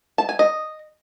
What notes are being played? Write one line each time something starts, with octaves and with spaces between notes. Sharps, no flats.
A5
G#5
D#5